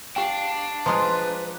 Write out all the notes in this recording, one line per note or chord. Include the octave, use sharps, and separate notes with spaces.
D4 G4 F5 G5
F3 G#3 F4 B4 A#5 D#6